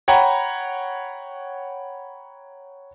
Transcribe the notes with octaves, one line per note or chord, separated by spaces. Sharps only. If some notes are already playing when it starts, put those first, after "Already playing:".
C#5 F#5 G5 A#5 B5